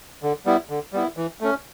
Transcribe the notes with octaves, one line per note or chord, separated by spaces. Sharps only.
D3
G3 B3 E4
D3
G3 B3 E4
E3
A3 C#4